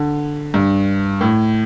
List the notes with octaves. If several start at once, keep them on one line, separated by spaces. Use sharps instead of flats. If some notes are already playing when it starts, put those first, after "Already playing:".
Already playing: D3
G2
A2